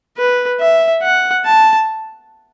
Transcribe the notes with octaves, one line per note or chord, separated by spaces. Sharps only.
B4
E5
F#5
A5